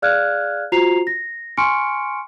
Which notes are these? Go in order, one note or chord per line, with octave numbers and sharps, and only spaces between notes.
G#4 D5 F5 F6 F#6 G#6
F4 F#4 C5 A#5 C7 F7
A#6
G#5 C6 C#6 F6 C#7 D7